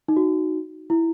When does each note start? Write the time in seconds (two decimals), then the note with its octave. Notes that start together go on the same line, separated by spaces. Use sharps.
0.08 D#4
0.17 F#4
0.90 E4